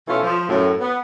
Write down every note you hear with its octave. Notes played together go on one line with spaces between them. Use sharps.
B2 E3 A3 C#4 F4 A4
F3
F#2 A2
B3